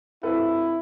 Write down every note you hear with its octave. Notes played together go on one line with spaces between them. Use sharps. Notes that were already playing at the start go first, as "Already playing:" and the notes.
G#1 E4 A4 B4